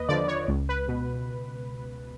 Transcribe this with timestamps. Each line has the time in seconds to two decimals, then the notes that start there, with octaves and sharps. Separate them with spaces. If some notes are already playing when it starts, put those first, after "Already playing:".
Already playing: D#2 B4 D#5
0.09 D3 F3 D5
0.28 C#5
0.48 C#2
0.69 B4
0.88 B2